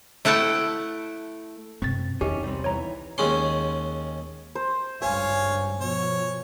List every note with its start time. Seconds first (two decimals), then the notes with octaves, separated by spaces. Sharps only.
0.25 A3 E4 F#5 G5 A5
1.82 F#2 C3 C4 A6
2.21 E2 D#3 E3 C#4 G4
2.43 C2 G3 C4
2.64 D#2 E3 C#5 E5 A#5
3.18 D#2 G#3 C#4 C6
4.55 C5
5.02 G#1 C#2 G2 C#5 F5 G#5
5.81 B2 F3 C#5